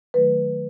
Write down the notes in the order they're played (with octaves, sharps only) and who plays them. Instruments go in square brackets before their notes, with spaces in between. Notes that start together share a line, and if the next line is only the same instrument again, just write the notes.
[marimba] D#3 F#3 A3 B4